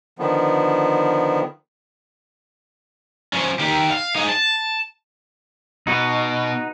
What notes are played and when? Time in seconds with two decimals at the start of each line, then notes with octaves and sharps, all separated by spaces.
0.19 D3 D#3 F3 B3
3.33 F3 C#4
3.59 D#3 G4
3.91 F5
4.16 D#4 G#4
4.29 A5
5.87 B2 D#4 F#4 B4